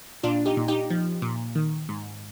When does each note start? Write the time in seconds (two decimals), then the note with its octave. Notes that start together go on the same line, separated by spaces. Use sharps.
0.23 A#2 D4 F4
0.46 D#4 G4
0.57 A#2
0.68 D#4 G4
0.90 F3
1.22 A#2
1.55 D#3
1.89 G#2